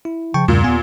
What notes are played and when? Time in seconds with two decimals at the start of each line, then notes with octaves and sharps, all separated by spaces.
0.05 E4
0.34 C#3 F3 G5 A5 C#6
0.48 E2 G2 A#2 C#3 G3 A#3
0.64 D#2 B3 G#5